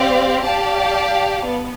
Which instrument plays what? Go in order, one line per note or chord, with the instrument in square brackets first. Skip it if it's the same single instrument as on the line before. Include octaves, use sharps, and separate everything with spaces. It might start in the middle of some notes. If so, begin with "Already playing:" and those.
Already playing: [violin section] C4 G4 D5 F5
G4 D5 F5 A5
B3